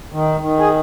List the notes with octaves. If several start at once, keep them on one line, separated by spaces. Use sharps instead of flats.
D#3
D#3
G#4